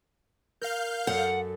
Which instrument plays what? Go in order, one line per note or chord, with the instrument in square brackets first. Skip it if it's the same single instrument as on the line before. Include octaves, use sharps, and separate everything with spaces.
[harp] A#4 [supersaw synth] F5 F6 G6
[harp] F#2 C#7 [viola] A4 [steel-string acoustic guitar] F#5